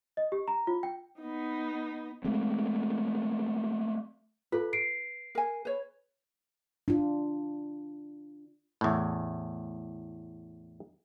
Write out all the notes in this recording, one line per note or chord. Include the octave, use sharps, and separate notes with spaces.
D#5
G4
A#5
F4
G5
B3 D#4
G#3 A3 C4
F4 A4 B4
C7 D7
A#4 G#5
B4 C#5
D4 F4
E2 A2